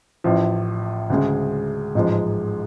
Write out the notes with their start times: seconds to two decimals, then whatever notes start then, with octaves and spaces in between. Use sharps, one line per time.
0.24 A1 A2 F3
1.10 D2 C#3 G#3
1.95 A1 G#2 F3 G#3